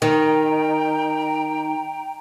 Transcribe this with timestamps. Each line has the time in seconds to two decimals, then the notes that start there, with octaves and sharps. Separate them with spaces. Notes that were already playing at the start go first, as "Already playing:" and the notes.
0.02 D#3 G5 A#5